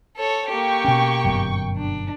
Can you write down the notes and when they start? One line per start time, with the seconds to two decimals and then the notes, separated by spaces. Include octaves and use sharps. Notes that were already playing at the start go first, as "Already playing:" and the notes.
0.17 A4 C#5
0.48 A#3 G4 G5 C#6
0.85 B2 C#4
1.24 G1 F#2 B2
1.76 D4